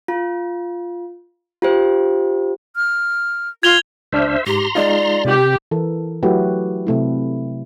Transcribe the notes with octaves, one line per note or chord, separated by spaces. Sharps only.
F4
F4 G4 C5
F6
F4 G#6 F7 G7
C#2 D4 C5 E5 F6
G#2 G4 A#5 C6
G#3 D#4 F4 D5
C3 G4
E3 A4 A#4
F#3 A3 E4 F#4 G4 B4
C3 A3 E4